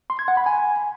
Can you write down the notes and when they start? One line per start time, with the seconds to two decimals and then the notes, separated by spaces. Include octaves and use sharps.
0.10 C6
0.19 G#6
0.28 F#5
0.37 B5
0.46 G#5